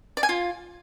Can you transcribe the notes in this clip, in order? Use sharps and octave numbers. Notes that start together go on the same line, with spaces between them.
D5
G#5
F4